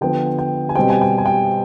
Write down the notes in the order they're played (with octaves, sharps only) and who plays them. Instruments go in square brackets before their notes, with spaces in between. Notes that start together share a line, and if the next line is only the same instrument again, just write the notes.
[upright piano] D3 F3 B3 G5
G5
G#5
B2 G3 C4 G5
G#5
G5
G#5
G5